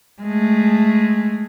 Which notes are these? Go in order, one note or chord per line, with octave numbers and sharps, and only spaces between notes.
G#3 A3